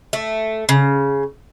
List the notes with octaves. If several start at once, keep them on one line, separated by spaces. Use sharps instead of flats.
A3
C#3